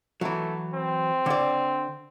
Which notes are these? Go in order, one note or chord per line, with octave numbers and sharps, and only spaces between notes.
E3 F#3 A3
C4
D3 D5